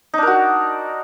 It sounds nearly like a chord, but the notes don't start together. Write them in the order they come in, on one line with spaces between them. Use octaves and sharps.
D#4 D4 A#4 F#4